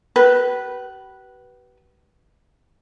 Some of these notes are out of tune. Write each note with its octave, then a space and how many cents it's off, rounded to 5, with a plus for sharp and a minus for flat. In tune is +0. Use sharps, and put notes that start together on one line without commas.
G4 -45 B4 -10